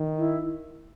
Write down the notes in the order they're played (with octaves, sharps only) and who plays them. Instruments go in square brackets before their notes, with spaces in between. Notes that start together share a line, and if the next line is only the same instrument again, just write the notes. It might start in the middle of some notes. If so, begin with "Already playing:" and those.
Already playing: [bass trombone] D#3
[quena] E4